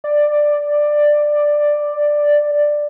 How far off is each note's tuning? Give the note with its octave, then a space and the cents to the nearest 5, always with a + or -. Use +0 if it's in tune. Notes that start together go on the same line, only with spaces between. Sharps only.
D5 +10